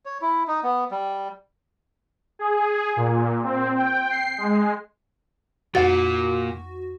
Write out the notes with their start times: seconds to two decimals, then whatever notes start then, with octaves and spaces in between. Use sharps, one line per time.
0.06 C#5
0.22 E4
0.48 D#4
0.64 B3
0.91 G3
2.39 G#4
2.96 A#2
3.44 C4
3.76 G5
4.10 C7
4.38 G#3
5.75 F2 A#2 F#4 A6